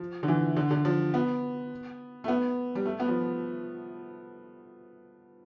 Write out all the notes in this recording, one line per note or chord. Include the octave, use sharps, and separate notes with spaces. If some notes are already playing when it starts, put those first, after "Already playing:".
Already playing: F3
D3
E3
D3
D3
F3
B3
A3
B3
G3
A3
B3
F3